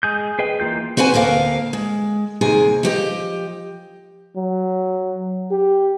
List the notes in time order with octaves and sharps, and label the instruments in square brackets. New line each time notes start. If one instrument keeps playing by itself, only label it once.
[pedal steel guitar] G#3 G#4 G6
G#4 B4 D#5 G5
E3 A#3 F4 G6
[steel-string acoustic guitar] C4 F#4 B4 C5 G#5
D2 A#3 A#4 F5
G#3
D#2 C3 G#4 A#4 G#5
F3 G4 D#5
[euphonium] F#3
G4